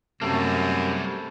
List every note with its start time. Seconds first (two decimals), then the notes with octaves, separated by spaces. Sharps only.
0.21 F#2 C3 G3 A3 A#3